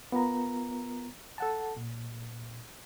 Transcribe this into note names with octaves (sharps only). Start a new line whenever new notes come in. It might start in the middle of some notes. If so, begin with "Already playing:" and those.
B3 F4 A#4 A#5
A4 F#5 A5
A#2